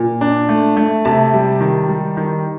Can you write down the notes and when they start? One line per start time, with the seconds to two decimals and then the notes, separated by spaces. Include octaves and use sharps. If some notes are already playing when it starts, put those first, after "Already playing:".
Already playing: A#2
0.21 D4
0.49 A3
0.77 A3
1.05 C3 A5
1.34 G3
1.61 D#3
1.89 G3
2.17 D#3